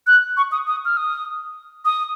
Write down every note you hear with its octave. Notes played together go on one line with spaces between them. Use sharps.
F#6
C#6
D#6
D#6
F6
D#6
D#6